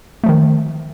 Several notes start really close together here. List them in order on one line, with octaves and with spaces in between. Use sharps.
A3 F3 D#3